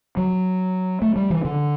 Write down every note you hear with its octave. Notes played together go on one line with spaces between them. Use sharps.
F#3
A3
G3
E3
D3